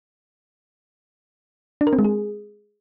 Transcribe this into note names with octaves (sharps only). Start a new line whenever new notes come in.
D4
A#4
C4
G#3
G#4